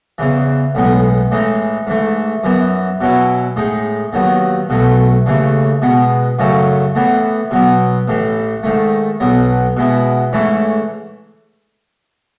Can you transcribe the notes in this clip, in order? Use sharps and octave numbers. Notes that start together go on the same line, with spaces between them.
E2 C#3 E3
B1 A2 G#3 B3
A2 E3 G#3 D#4
G#2 E3 A3
F#2 E3 B3
B2 F#3 C#4 E4
A2 G#3 D#4
D#2 D#3 F#3 B3
B1 B2 F#3 A3
D#2 C#3 E3 A3
B2 G#3 B3
F#2 C#3 F#3 A3 C#4
A2 E3 B3
B2 F#3 B3
A1 A2 E3
G#2 D#3 A3
B1 B2 F#3 B3
B2 G#3 B3 E4
G#2 E3 A3 C#4 E4